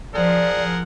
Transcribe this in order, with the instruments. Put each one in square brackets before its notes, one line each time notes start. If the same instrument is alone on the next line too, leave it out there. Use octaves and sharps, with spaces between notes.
[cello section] F3 [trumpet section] G#4 A#4 F#5 [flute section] D5